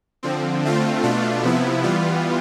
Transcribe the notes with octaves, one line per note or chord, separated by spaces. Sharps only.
D3 F3 C4
D3 A3 C4 F4
B2 A3 D4 F4
C3 F3 B3 E4
E3 G3 B3 F4